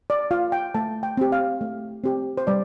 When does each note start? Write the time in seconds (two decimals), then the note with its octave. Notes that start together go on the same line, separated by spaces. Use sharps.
0.10 D5
0.31 F4 F5
0.52 G5
0.75 A3 A5
1.03 G5
1.17 C4 G4
1.32 F5
1.61 A3
2.04 C4 G4
2.38 C5
2.47 G3 D5